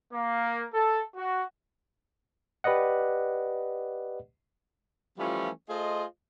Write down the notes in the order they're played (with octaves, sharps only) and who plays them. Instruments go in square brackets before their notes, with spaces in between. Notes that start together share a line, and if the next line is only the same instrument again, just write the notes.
[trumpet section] A#3
A4
F#4
[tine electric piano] G4 B4 D5 D#5 F#5
[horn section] E3 F3 G3 A3 C#4 F4
A3 F4 G#4 C5 D#5